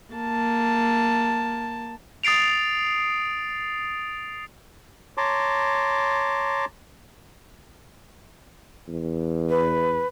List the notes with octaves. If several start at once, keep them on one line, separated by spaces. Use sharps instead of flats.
A#3 A5
D#6 A6 C7 D7 F7
C#5 A5 A#5 C6 D6
E2
B4